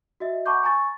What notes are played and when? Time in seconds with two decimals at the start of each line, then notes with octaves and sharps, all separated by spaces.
0.20 F#4 D#5 E5
0.46 F#5 A5 B5 C#6 D6 G6
0.64 G#5 A#5 C#6 A6